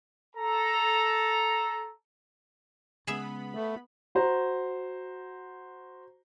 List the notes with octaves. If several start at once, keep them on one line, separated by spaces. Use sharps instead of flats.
A4 A#5
C#3 G#3 B3 G#4 E5 B5
A3
F#4 C5 A#5